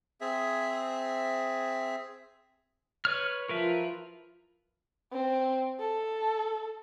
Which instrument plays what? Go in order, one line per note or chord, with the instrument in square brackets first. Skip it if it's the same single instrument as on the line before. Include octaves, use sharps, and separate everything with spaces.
[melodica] C4 G#4 E5
[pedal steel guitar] B4 C#5 F6
[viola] F3 F4 [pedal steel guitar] A#4 B4 E5
[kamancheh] C4
A4